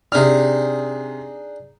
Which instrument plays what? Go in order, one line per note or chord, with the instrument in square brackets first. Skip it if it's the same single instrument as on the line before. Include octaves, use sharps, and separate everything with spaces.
[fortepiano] C3 F6 [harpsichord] D4 D#4 G#4